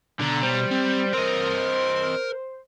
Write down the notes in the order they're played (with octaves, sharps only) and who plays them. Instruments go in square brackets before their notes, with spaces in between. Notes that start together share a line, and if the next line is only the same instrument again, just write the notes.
[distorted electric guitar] B2 A#5 [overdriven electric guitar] D3
[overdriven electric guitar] G3 [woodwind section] C5
[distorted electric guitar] C4
[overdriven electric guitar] C4 D#5 [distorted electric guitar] A#4